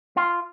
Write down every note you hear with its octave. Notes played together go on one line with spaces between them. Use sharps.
F4